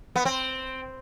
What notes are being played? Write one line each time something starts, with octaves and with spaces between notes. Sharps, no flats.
B3
C4